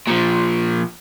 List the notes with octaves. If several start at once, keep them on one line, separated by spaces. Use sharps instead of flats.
A#2 F3